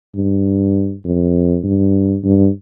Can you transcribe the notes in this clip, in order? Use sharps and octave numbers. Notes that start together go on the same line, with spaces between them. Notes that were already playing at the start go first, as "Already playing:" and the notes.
G2
F2
G2
G2